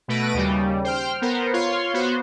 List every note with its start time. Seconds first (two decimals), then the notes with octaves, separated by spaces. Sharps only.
0.08 B2 A3 B4 A#6 D7 D#7
0.34 D#2 C#3 G3
0.84 C5 G5 F6
1.22 B3 A#4 C5
1.53 F4 C#5 F5 C6
1.93 B3 F#4 C5